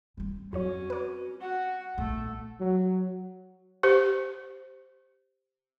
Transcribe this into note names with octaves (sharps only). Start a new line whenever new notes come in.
G3 C4
F2 F#3 C#4 F#4 C#5
B4 D5
F#4 F#5
A#1 A3 B3
F#3
G4 C5